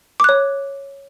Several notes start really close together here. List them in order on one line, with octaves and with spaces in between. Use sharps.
D6 F#6 C#5